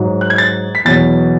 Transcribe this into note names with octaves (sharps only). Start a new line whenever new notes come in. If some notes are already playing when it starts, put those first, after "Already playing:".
Already playing: G#2 F#3
F#6
G#6
A6
B6
E2 B2 F#3 A6